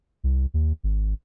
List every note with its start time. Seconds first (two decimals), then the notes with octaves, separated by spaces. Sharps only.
0.24 C2
0.54 D#2
0.84 G#1